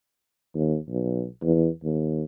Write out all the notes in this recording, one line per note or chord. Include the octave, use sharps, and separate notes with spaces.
D#2
B1
E2
D#2